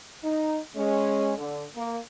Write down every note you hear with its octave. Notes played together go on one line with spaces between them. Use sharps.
D#4
G#3 C#4
D3
A#3